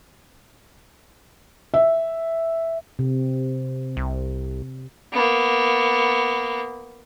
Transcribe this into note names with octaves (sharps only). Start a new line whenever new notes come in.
E5
C3
C2
A#3 B3